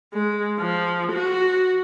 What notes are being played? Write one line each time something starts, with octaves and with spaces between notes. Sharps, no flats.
G#3
F3
F#4